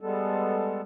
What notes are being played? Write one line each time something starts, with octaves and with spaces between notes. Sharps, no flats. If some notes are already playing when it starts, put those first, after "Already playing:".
G3 G#3 B3 A4